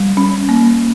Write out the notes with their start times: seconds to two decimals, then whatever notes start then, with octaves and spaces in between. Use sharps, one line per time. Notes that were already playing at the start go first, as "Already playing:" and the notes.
Already playing: G3
0.17 C#4
0.49 A#3